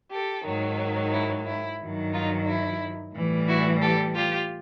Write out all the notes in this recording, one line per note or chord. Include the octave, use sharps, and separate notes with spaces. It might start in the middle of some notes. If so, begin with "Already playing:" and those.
G4 A4
G#2 D#3 F#3
E4
E4
G2 D#3 F#3
D#4 F4
E4
A2 E3 G3
E4 F#4
G4 A4
F4 G4